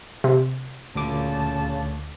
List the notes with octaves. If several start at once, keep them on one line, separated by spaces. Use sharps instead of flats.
C3
D2 A#2 C#3 A5 D6